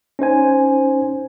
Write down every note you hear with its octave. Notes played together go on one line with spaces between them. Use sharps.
C#4 D#4 C5 G#5